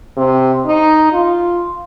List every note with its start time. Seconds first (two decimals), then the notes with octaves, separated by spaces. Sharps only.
0.17 C3
0.66 D#4
1.13 F4